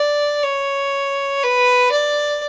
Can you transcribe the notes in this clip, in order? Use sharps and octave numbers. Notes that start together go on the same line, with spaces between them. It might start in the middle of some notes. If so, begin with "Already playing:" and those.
Already playing: D5
C#5
B4
D5